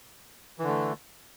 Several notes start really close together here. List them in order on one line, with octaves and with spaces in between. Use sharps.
E3 D3 A3